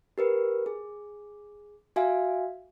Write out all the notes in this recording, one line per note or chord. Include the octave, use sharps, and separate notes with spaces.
G4 A#4 B4
G#4
F#4 E5 F5 G#5